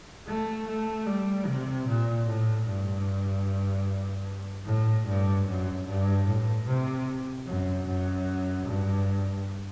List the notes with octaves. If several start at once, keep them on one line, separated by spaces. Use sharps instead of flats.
A3
A3
G3
C3
A#2
A2
G2
A2
G2
F#2
G2
A2
C3
F#2
F#2
G2